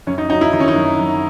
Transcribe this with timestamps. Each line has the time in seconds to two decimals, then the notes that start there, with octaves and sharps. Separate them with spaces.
0.07 F#2 C#4
0.18 D#4
0.30 F#3 D#4
0.41 E4
0.53 D#3 D#4
0.60 C#4
0.68 D#4
0.76 F#2
0.99 F#2